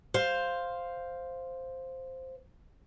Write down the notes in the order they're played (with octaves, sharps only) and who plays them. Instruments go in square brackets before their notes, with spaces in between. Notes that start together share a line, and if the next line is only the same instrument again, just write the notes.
[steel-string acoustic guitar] C5 F5